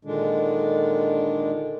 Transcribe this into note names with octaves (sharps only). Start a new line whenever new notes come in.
A#2 D3 D#3 G#3 D4